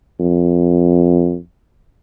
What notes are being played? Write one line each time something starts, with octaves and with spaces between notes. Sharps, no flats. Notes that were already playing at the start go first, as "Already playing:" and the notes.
F2